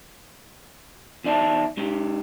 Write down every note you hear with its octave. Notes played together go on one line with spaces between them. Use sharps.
E2 D#4 D5 E5 A5
G#3 D#4 G4